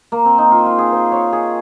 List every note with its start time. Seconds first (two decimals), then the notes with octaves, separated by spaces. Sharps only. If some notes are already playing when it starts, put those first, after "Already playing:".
0.12 A#3
0.25 C4
0.38 D#4
0.51 F4
0.66 F4
0.79 G#4
0.93 C5
1.12 C#5
1.33 G#4